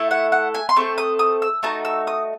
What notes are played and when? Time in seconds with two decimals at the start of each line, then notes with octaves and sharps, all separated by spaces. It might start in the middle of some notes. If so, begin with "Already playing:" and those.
Already playing: A3 E4 A4
0.11 F#5
0.32 F#5
0.54 G#5
0.69 C6
0.76 A3 C4 A4 C#6
0.98 D#6
1.19 D#6
1.42 E6
1.63 A3 D#4 F#4 A5
1.85 E6
2.07 D#6